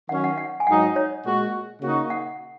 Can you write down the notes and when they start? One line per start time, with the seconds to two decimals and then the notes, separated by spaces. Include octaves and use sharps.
0.09 D#3 F#3 C#4 F#5
0.24 F#5
0.38 F#5
0.60 G#5
0.67 G#2 F#3 D#4 F#5
0.96 C#5
1.25 A#2 G#3 F#4
1.81 C#3 A#3 D#4 F#4
2.10 F#5